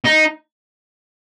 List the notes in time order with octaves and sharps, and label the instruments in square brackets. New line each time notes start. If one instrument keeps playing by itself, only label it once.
[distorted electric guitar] D#4